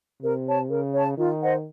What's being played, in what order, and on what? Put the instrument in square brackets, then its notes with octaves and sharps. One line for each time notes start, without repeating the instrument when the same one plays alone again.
[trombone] C3 [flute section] A#4
[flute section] C#5 A5
[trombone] C#3 [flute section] A#4
[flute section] C#5 A5
[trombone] D#3 [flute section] F4
[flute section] C5 D#5 F#5